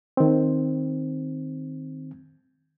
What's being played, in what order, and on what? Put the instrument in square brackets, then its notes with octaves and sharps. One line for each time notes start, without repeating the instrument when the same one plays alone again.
[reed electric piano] D#3 C4